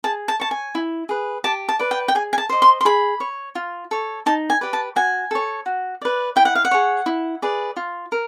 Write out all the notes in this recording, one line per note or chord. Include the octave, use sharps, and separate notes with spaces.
G#4 A5
A5
C#5 A5
G#5
E4
G#4 B4
G4 A5
A5
B4 D5
G5
G5
G#4 G#5
G#5
A5
C5 D#5
C6
C6
G#4 B5
C#5
F4
A4 C#5
D#4 A5
G#5
G4 B4 D5
A5
F#4 G#5
A4 C#5
F#4
B4 D5
E4 G5
F#5
F5
F#5
G#4 C#5
E4
G#4 B4 D5
F4
A#4